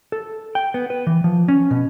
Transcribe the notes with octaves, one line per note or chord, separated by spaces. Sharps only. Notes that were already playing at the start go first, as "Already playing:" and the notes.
A4
G5
B3
B4
E3
F3
C#4
B2